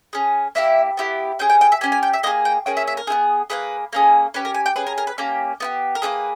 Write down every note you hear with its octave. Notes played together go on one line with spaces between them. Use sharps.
C#4 G#4
A#3 E4 G4 E5
B3 E4 G4
C#4 G#4 G5
G5
G5
E5
C#4 G4 G#5
G#5
G5
E5
A#3 D#4 G#4 D#5
G5
A#3 C#4 G#4 G5
E5
E5
A#4
B3 E4 G#4
A#3 D#4 G#4 B4
A#3 C#4 G#4
C#4 G4 B4
A#4
G#5
G5
C#4 G#4 B4
A#4
A#4
B4
A#3 C#4 G4
B3 E4 G4
A#4
A#3 C#4 G#4 B4